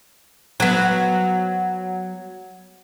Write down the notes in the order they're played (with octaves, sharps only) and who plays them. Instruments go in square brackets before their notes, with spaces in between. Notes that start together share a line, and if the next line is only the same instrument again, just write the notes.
[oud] F#3 B3